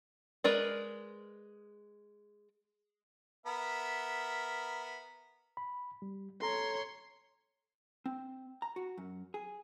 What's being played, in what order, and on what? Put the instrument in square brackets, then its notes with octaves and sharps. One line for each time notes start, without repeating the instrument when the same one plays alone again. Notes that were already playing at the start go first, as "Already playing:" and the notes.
[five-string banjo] G#3 A#4 B4 D5
[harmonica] B3 A#4 E5
[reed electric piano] B5
G3
[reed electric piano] A4 A#5 [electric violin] C#5 C6
[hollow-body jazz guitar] C4
A#5
F#4
F#2
G#4